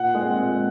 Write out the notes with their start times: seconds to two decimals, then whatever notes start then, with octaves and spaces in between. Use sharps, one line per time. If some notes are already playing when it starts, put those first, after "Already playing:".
Already playing: A#2 F#5
0.15 G#3 C4
0.37 A#2